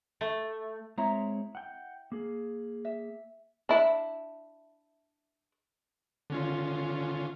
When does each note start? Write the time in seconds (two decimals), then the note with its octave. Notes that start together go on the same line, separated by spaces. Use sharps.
0.21 A3
0.98 G#3 C4 E4 C#5 A#5
1.55 F#5 G5
2.12 A#3 G#4
2.85 E5
3.69 D4 E4
6.30 D3 C#4 F4